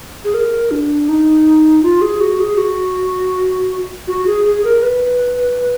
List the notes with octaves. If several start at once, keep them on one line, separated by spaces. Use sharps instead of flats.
G#4
A#4
D4
D#4
F4
G#4
F#4
G#4
F#4
F#4
G#4
G#4
A#4
B4